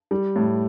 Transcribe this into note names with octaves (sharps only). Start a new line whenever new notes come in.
G3
A2